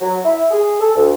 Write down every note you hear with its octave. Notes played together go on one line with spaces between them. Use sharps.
F#3
E4
G#4
A4
D2